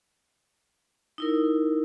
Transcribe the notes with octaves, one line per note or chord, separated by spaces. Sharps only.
D#4 E4 A#4